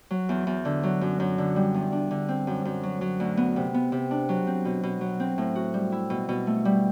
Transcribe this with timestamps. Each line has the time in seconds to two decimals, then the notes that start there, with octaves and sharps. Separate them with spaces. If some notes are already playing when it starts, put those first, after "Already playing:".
0.11 F#3
0.29 E2
0.47 E2
0.65 D3
0.83 F#3
1.01 F#2
1.20 F#2
1.38 D3
1.56 G3
1.74 E2
1.92 D4
2.11 D3
2.29 C4
2.47 F#2
2.65 F#2
2.83 F#3
3.01 F#3
3.20 D2
3.37 B3
3.56 C3
3.74 B3
3.92 C3
4.11 D4
4.29 F#3
4.47 C4
4.65 B2
4.83 B2
5.01 F#3
5.20 C4
5.38 A2
5.55 F#4
5.74 G3
5.92 E4
6.10 B2
6.29 B2
6.47 A3
6.65 G3